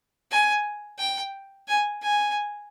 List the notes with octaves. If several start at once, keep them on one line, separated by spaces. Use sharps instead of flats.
G#5
G5
G#5
G#5